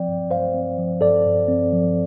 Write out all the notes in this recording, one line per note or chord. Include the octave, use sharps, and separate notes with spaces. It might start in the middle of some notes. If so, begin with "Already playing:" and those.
Already playing: F3 C4 D5 G5
G2
G2 C5 F5
C4
F3
G2 A4 D5
G2
C4
F3